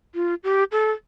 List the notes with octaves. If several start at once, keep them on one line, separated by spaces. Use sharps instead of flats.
F4
G4
A4